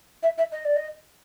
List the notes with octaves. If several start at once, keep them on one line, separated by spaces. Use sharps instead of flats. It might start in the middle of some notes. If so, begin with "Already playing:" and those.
E5
E5
D#5
D5
D#5